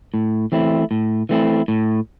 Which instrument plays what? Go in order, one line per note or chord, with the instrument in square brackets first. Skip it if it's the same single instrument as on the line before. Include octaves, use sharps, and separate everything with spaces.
[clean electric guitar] A2
E3 A3 C4 E4
A2
E3 A3 C4 E4
A2